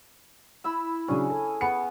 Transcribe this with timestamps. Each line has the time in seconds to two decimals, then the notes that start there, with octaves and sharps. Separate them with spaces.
0.64 E4 B5 E6
1.08 C#3 F#3 C#4 D4 G#4
1.30 A4
1.61 B3 G#4 C#7